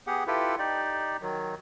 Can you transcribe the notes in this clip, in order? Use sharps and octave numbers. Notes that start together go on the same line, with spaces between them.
B3 G4 G#4 F#5
E4 F4 G4 A4 B4
D#4 G4 D5
D#3 F#3